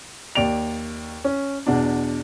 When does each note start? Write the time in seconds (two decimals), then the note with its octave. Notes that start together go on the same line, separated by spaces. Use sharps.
0.35 D#2 D5 D7 F7
1.24 C#4
1.66 E2 B2 D4